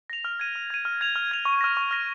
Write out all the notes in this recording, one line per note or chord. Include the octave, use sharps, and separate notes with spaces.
A#6 F7
F6
G#6 D#7
F6
G#6 D#7
F6
G#6 F7
F6
G#6 F7
C#6
F6 A#6
C#6
F6 A#6